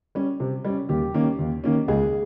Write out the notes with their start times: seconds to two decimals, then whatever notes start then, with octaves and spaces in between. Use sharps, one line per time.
0.15 G3 C#4
0.40 C3
0.65 G3 C#4
0.89 D#2 G4
1.14 D#3 A#3 C#4
1.39 D#2
1.64 D#3 A#3 C#4
1.88 C#2 G#4